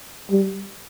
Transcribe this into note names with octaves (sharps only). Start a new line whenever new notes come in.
G3